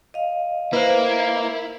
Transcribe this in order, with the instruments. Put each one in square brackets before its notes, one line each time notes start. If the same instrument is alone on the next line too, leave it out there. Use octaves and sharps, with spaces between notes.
[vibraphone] D#5 F5
[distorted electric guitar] A#3 [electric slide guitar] E4 [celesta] B4 C5